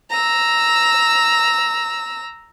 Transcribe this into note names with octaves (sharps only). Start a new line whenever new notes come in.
A#5 E6